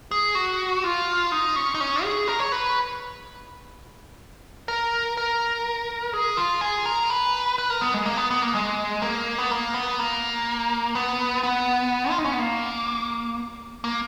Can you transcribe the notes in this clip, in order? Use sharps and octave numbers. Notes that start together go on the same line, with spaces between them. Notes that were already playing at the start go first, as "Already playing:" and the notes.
G#4
F#4
F4
D#4
C#4
D#4
C#4
G#4
A#4
C#5
B4
A#4
A#4
G#4
F4
G#4
A#4
B4
B4
A#4
B3
G#3
A#3
B3
B3
A#3
G#3
A#3
B3
A#3
B3
A#3
B3
B3
F4
D#4
C#4
B3
A#3
A#3